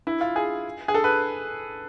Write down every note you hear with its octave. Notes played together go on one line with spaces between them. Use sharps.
E4
F4
G#4
G#4
A4
B4